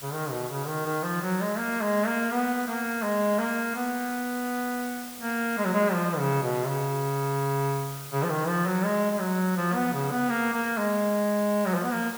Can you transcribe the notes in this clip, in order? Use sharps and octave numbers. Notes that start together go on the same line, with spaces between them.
C#3
D#3
B2
C#3
D#3
D#3
F3
F#3
G#3
A#3
G#3
A#3
B3
A#3
G#3
A#3
B3
A#3
G#3
F#3
G#3
F3
C#3
B2
C#3
C#3
F3
D#3
F3
F#3
G#3
G#3
F#3
F3
B3
C#3
B3
A#3
A#3
G#3
F#3
F3
B3
A#3